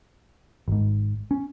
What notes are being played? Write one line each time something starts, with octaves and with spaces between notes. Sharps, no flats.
G#1 G#2
C#4